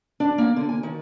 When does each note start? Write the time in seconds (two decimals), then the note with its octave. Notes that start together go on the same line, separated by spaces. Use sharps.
0.20 D4
0.38 A#3
0.56 D3
0.69 G#5
0.83 D#3